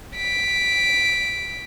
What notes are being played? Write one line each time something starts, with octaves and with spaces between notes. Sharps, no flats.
B6 D7